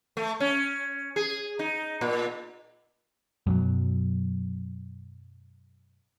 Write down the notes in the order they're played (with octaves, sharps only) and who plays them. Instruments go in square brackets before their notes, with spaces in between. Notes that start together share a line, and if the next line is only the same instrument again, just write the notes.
[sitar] A3
C#4
G#4
D#4
A#2
[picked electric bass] F#2 B2 F#3